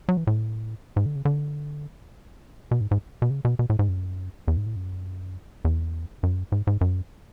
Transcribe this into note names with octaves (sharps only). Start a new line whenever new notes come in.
F#3
E3
A2
G#2
D3
C#3
D3
B2
G#2
G#2
B2
C#3
B2
B2
A2
G#2
F#2
E2
G#2
A2
F#2
E2
F#2
G#2
G#2
F#2